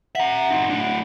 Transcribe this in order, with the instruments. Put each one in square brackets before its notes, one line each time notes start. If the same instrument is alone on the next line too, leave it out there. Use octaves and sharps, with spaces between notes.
[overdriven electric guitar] E5 A#5 [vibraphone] F#5
[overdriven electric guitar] C4 D#4
A2 D4